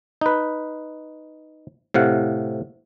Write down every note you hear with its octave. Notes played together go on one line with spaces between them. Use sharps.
D#4 B4
A2 C3 F5 F#5